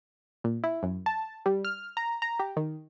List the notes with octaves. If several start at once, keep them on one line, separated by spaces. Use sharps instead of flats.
A#2
E4
F#2
A5
G3
F6
A#5
A#5
G4
D#3